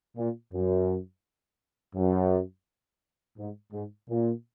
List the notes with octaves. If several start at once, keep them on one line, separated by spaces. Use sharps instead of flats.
A#2
F#2
F#2
G#2
G#2
A#2